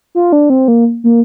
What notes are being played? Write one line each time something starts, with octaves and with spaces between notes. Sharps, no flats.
F4
D4
C4
A#3
A#3